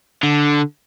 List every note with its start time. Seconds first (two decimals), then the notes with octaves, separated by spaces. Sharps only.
0.23 D3